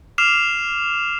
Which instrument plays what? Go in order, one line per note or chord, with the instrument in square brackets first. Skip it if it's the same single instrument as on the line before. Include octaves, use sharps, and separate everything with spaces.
[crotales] D6 F6 C7 E7 F7